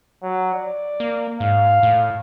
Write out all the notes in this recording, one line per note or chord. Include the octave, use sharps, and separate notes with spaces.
F#3
D5
A#3
G#2 F5
A2